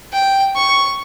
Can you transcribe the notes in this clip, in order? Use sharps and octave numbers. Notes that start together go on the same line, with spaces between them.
G5
C#6